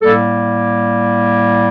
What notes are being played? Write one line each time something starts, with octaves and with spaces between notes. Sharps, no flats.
A2 G3 A#3 A4